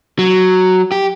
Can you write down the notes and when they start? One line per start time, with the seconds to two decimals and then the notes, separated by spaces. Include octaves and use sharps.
0.19 F#3
0.92 G4